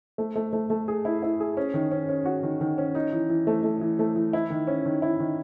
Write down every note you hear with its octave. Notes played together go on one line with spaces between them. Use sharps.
A3
A3
A3
A3
G#4
E4
E4
G#4
C#4
D#3
C#4
C#4
F#4
D#3
D#3
C#4
D#4
E3
E3
A3
A3
E3
A3
E3
E4
D#3
C#4
D#3
E4
D#3